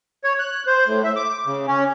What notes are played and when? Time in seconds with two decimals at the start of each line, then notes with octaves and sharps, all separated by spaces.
0.24 C#5
0.39 F#6
0.67 C5
0.85 A2
1.04 E5
1.16 D6
1.46 C#3
1.68 C#4